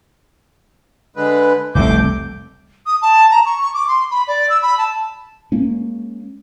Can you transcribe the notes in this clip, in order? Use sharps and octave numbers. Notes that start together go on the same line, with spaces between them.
D3 G#3 B4
F1 C2 C3 A3 D6 G6
D#6
A5
A#5
C#6
C#6
D6
C6
B5
D5
E6
B5
A5
G#3 A#3 C#4